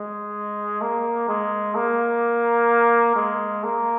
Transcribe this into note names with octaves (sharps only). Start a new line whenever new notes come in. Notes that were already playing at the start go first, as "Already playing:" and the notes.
Already playing: G#3
A#3
G#3
A#3
G#3
A#3